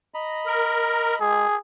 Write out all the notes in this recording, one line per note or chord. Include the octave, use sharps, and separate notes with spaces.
D#5 A#5 B5
A#4
G#3 G#4